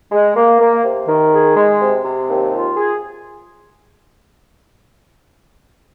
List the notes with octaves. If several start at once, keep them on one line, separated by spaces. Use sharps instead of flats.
G#3
A#3
A#3
C3
D#3
G#4
G#3
C3
C3
D#2
F4
G#4